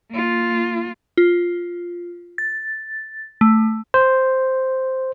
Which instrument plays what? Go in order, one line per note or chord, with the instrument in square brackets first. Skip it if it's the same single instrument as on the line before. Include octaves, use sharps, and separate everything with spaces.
[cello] A#3 F4
[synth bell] F4
A6
A3
[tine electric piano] C5